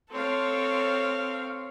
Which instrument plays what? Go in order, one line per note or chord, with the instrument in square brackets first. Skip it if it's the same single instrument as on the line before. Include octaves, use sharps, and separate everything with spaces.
[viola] C4 F5 [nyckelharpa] A4 C#5